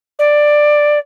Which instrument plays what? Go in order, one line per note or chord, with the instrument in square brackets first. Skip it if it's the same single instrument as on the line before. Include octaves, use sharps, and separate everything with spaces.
[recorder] D5